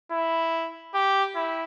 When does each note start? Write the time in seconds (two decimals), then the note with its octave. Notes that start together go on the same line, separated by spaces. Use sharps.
0.11 E4
0.94 G4
1.35 E4